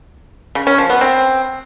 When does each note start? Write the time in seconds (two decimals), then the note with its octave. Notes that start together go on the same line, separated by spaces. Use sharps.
0.55 C#3
0.67 C#4
0.78 F3
0.90 B3
1.01 C4